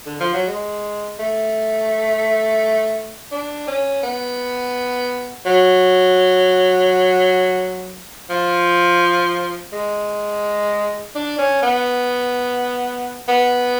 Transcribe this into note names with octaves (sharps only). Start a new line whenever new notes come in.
D3
F3
F#3
G#3
A3
D4
C#4
B3
F#3
F3
G#3
D4
C#4
B3
B3